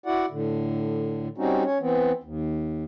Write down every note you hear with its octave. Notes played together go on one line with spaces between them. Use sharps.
E4 F#4 D5 F#5
A2 D3
G3 C4 C#4 D#4 F#4
C#4 C#5
E3 B3 C4
D#2